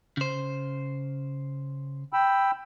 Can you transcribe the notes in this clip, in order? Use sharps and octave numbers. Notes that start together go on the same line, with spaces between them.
C#3 C5
G5 B5 E6